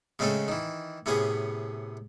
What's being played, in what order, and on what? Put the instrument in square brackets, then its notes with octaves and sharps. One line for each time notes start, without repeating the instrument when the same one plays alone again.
[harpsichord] C#3 G#3 A3 C4 C#4 A4
D#3 E3
A2 C3 B3 C#4 G#4